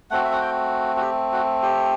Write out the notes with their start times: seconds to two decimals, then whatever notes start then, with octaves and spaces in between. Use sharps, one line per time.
0.11 A3 C4 F#4 F#5
0.24 E5
0.32 F#5
0.42 G5
0.96 F#4
1.01 G4
1.33 F#4
1.62 G4